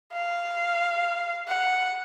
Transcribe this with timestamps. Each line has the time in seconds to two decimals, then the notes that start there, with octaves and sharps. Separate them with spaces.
0.13 F5
1.48 F#5